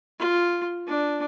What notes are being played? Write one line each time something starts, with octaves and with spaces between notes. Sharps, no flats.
F4
D4